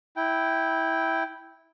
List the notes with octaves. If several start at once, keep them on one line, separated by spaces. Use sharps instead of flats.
E4 G5